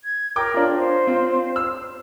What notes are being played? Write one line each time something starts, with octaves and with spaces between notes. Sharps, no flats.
G#6
A#4 G5 D6
D4 F4
C5
C4 F4
E6